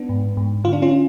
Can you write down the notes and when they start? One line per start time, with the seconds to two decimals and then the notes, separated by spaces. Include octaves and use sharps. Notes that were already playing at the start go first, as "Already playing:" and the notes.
Already playing: B3 D4
0.09 G#2
0.37 G#2
0.64 D3 F4
0.73 D4
0.82 C#4 F4